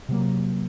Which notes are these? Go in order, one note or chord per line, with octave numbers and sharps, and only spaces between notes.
C3 F#3 A#3